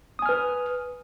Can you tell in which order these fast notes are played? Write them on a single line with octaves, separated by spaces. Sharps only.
D#6 G#5 F6 B4